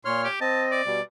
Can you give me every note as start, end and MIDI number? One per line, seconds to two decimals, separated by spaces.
0.05 0.28 46
0.05 0.28 73
0.05 0.19 84
0.05 0.28 89
0.24 0.40 67
0.41 0.81 60
0.41 0.81 75
0.41 0.65 81
0.71 1.02 74
0.86 1.01 47
0.86 1.01 55